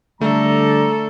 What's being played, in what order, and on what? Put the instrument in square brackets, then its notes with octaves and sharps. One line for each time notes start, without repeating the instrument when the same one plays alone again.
[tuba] D3 [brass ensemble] G3 D5 A#5 [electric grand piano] A3 [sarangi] A4